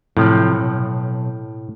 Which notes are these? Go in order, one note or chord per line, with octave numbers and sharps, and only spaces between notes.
F#2 A2 C3 F3
B1